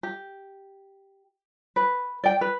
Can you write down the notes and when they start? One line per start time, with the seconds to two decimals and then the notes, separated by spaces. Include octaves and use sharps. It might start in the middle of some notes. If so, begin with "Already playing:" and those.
0.03 G4
1.76 B4
2.24 D5 G5
2.41 B4